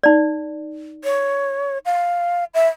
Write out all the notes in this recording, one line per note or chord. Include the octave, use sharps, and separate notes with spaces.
D#4 D5
C#5
F5
E5